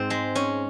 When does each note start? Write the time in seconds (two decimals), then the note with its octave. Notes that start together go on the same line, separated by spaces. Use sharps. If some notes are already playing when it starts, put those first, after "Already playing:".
Already playing: G#2 C4
0.10 G#3
0.35 C#4